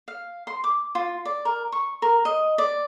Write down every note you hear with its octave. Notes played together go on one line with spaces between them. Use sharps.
F5
C6
D6
F4
D5
A#4
C#6
A#4
D#5
D5